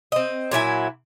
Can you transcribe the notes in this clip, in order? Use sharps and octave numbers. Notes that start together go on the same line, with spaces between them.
C4 D#5
A#2 F#3 E4 G#5